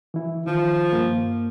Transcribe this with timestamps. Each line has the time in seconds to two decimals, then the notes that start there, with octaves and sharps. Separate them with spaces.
0.14 E3 E4
0.47 D#3 F3
0.93 G2 A#3